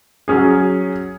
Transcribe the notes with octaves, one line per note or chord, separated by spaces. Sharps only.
F#3 C#4 G#4